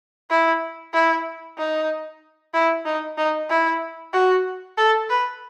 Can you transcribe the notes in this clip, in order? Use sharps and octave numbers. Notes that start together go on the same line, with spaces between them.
E4
E4
D#4
E4
D#4
D#4
E4
F#4
A4
B4